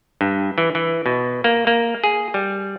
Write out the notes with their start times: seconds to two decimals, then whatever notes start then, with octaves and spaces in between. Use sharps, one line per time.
0.21 G2
0.58 E3
0.75 E3
1.06 B2
1.44 A#3
1.67 A#3
2.04 G#4
2.34 G3